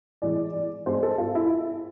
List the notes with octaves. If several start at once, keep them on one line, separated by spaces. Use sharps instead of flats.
A2 E3 G#3 D5
G#2 G#3 C5
A4
F4
E4